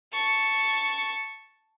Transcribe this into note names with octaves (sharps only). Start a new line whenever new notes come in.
A5 C#6